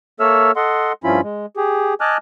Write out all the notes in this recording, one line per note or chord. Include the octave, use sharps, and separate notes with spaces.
A#3 A4 C#5 E5 E6 F6
A4 D#5 F#5 C6
G2 F3 C#4 E4 F4 B5
G#3
G4 G#4
D#5 G#5 A5 D6 F6 F#6